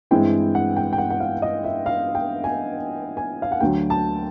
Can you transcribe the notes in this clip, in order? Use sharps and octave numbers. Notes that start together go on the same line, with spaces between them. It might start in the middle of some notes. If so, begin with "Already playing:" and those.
G2 E3 G#3 C4 E4 G5
F#5
G5
G5
F#5
F#5
F5
D#5
E5
F5
G5
G#5
G#5
F5
F#5
D2 D3 F#3 G5
A5